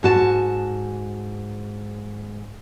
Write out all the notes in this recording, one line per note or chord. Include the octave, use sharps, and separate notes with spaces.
G#2 F#4 A5